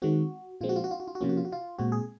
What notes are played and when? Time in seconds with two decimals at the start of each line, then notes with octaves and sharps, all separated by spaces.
0.02 D#3 G#3 C4 F#4
0.61 A#2 F3 G#3 C4 F4
0.69 F#4
0.76 F4
0.84 F#4
0.91 F4
1.00 F#4
1.08 F4
1.15 F#4
1.21 C3 F3 A#3 C#4 F4
1.29 F#4
1.37 F4
1.45 F#4
1.52 F4
1.79 A#2 G#3 C4 F#4
1.92 G#4